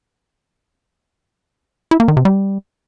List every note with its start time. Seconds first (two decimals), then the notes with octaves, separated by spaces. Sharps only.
1.91 E4
2.00 A#3
2.08 D#3
2.17 C3
2.25 G3